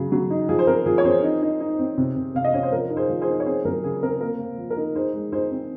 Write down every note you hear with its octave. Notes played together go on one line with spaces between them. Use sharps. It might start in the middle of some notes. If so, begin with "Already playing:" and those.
Already playing: C#3 F#3
F#3
D#4
F3 G#4
C5
C4 A#4
F3 G#4
C#5
C4 G#4 C5
D#4
D#4
D#4
C4
C3
C3
C3 F5
D#5
C#4 C#5
C5
F3 A#4
D#4
G#4 C5
F3
G#4 C5
D#4
C#5
C4 G#4 C5
F#3 A#4
C#3 G#4
C4 A#4
A#3 A#4
A#3
F3
A#4
D#4
D#4 G#4 C5
G#3
D#4 G#4 C5
C4